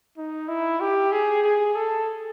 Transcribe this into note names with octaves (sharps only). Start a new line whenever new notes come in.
D#4
E4
G4
G#4
G#4
A4